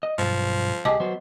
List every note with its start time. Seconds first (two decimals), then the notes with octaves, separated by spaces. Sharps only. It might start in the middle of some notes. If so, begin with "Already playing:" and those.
0.03 D#5
0.18 B1 G2 F3
0.85 C2 G4 G#4 D#5 A5 D6
1.00 F#3 B3 C5